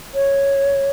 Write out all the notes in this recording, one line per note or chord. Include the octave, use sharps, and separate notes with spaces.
C#5